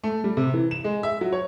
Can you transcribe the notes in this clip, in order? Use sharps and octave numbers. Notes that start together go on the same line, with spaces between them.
A3
G3
C3
E3
E7
G#3
E5
F#3
C#5